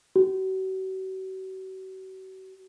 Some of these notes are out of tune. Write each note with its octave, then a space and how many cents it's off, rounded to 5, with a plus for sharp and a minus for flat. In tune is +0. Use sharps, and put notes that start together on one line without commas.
F#4 +40